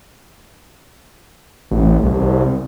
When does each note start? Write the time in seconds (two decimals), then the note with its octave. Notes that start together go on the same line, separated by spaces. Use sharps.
1.71 A1
2.03 C2